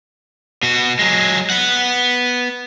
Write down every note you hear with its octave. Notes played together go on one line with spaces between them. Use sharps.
B2 F#4
F#3 G#3
B3 F#5